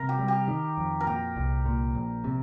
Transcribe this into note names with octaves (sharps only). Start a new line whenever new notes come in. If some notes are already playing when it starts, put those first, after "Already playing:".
Already playing: C3 A#4
G4
G3
G4
D#3
F2
A#4
A#2 G4
C2
A#2
A#1
C3